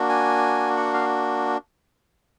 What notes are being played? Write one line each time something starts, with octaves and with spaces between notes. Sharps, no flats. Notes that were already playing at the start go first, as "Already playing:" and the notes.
Already playing: A#3 D4 F#4
G#5
F#5
F5